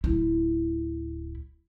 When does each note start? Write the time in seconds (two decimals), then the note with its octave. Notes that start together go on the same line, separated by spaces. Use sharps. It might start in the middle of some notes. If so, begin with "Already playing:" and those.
0.04 D1 E4